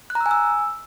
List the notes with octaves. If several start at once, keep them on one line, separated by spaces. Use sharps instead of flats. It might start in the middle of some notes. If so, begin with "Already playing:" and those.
F#6
A#5
E6
G#5
E6